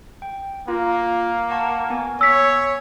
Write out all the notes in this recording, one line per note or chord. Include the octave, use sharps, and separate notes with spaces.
G5
A#3 F4
F#5 A5 C#6
B3 G#5
C#5 E6 B6